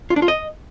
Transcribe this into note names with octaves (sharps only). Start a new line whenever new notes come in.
F4
D4
F4
D#5